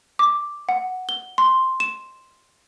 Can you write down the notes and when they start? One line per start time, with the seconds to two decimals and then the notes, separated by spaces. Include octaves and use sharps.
0.19 D6
0.69 F#5
1.09 G7
1.38 C6
1.80 E7